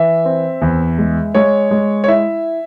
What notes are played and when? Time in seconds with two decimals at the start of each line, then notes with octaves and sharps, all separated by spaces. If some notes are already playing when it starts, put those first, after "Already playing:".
Already playing: E3 E5
0.25 C4
0.62 E2
0.98 G#3
1.35 G#3 C#5
1.71 G#3
2.04 C#5
2.08 E4 E5